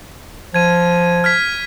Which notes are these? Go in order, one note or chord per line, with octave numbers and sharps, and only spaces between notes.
F3 G#6 D#7
F6 G#6 B6